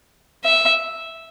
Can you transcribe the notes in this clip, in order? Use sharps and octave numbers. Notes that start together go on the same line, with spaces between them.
E5